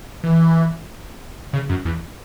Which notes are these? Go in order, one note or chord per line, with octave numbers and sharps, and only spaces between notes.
E3
C#3
F#2
E2